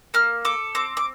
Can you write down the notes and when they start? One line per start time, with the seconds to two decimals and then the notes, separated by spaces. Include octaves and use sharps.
0.14 A#3 F6
0.45 A4 D6
0.75 C4 D6
0.97 D6